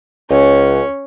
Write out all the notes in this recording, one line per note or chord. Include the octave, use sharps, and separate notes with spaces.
C#2 C#4